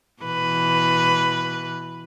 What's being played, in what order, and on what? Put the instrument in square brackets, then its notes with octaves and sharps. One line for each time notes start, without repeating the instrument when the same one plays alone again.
[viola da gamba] B2 E3 B4